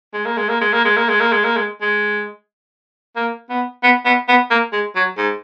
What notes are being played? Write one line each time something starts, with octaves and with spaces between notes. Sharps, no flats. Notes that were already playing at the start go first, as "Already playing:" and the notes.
G#3
A#3
G#3
A#3
G#3
A#3
G#3
A#3
G#3
A#3
G#3
A#3
G#3
G#3
A#3
B3
B3
B3
B3
A#3
G#3
F#3
G#2